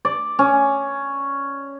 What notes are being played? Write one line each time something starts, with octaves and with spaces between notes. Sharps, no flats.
D5
C#4